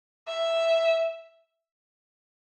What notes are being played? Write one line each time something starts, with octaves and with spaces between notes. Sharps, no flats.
E5